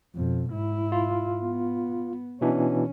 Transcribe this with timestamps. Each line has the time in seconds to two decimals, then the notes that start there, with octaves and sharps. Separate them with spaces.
0.15 F2 B2
0.51 G#2 E4
0.92 F4
1.42 B3
2.41 B2 E3 C#4 D4